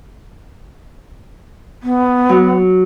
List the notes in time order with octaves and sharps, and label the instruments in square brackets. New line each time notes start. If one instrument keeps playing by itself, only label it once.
[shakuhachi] B3
[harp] F#3